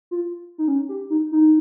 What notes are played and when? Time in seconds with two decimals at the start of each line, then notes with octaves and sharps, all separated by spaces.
0.11 F4
0.58 D#4
0.68 C#4
0.89 G4
1.10 D#4
1.32 D#4